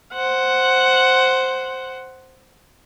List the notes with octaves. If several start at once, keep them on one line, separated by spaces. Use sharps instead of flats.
C5 F#5